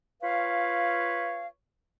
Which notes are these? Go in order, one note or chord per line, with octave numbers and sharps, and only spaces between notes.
F4 B4 C#5 F5